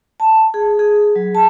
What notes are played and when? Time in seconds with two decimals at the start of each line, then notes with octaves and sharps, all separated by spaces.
0.20 A5
0.54 G#4
0.79 G#4
1.16 F#3
1.35 A5